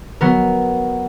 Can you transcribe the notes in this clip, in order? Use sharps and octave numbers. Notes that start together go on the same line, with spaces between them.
F#3 B3 A#4